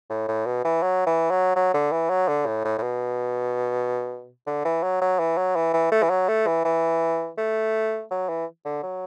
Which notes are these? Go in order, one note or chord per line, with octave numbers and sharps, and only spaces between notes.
A2
A2
B2
E3
F#3
E3
F#3
F#3
D3
E3
F#3
D3
A2
A2
A2
B2
D3
E3
F#3
F#3
E3
F#3
E3
E3
A3
E3
F#3
A3
E3
E3
A3
F#3
E3
D3
F#3